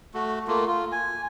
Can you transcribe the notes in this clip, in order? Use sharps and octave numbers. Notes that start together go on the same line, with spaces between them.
A3 F#4
A3 A#3 F4
F4
G#5